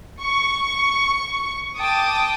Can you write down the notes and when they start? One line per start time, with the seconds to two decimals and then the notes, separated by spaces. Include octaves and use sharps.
0.18 C#6
1.75 G5 A5 D6 D#6